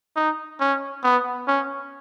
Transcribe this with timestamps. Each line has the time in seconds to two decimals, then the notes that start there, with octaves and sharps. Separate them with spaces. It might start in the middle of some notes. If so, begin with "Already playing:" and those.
0.16 D#4
0.60 C#4
1.04 B3
1.48 C#4